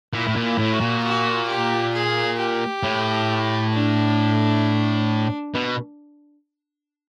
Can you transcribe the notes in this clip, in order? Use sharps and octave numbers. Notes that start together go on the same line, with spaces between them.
A#2 E4
A2
A#2
E4
A2
F#4
A#2
F#4
G4
G#4
G4
A2
D4
B2